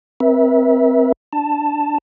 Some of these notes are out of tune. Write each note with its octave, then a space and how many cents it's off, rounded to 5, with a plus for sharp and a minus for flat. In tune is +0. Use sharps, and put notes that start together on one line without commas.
C4 +0 A#4 +45 E5 -15
D4 +0 A5 +5